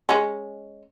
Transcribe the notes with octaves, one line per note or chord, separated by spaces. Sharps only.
G#3 C#4